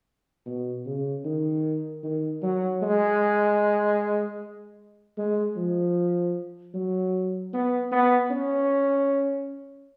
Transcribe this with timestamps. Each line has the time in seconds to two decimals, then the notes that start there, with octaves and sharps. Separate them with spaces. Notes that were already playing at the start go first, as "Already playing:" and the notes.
0.46 B2
0.86 C#3
1.25 D#3
2.03 D#3
2.43 F#3
2.82 G#3
5.18 G#3
5.56 F3
6.74 F#3
7.53 B3
7.92 B3
8.31 C#4